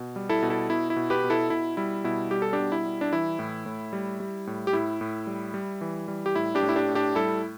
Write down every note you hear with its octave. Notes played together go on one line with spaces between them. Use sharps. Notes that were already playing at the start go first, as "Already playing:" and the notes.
Already playing: B2
G3
E4 A4
B2
E4 A4
B2 E4
E4
B2
G4 B4
B2
E4 A4
B2 E4
G3 E4
B2 E4
G3 G4
A4
D4 G4
B2
E4
G3
D4
E3 E4
A2
A2
G3
G3
A2
G4
A2 E4
A2
G3
G3
E3
G3
G4
A2 E4
D4 G4
A2
E4
D4 G4
A2
D4 G4
G3 E4 A4